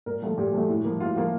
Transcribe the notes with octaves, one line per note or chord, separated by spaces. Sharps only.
A#2 A#4
F3 A3
A#2 G4
F3 A3
A2
F3 A#3
A2 F4
F3 A#3 F4